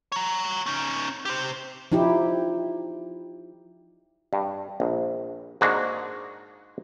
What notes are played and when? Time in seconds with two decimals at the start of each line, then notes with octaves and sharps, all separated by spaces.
0.12 C#5 A#5
0.66 C#4 D#4
1.25 G4 C5
1.92 F3 D#4 E4 G4
4.33 G2
4.80 A#1
5.61 G#2 G#3 A#3 D4 F#4